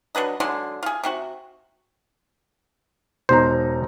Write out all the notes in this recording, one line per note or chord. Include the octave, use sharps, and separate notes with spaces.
F#3 D4 B4 D#5
D3 F#3 G#3 C6
F4 G#4
C3 C4 F#4
E1 D#4 C5 A#5